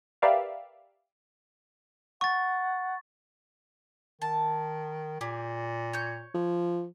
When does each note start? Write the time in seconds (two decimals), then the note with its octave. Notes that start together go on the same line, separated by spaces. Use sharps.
0.22 G4 A#4 B4 D5 E5 F5
2.21 F#5 C#6 A6
4.22 D#3 A5
5.21 A#2 G4 G#4
5.93 C#5 G6
6.35 F3